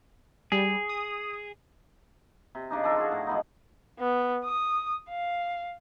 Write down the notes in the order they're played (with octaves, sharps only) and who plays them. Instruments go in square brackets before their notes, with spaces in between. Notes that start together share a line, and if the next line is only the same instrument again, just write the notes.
[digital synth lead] G3 [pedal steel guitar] G#4
[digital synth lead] D#6
[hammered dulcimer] C3
C#3 D4 D#4
F3 D4 A4 A#4
F4 F#4 G#4
A2
F3 G#3 B3 D#4
[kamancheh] B3
D#6
F5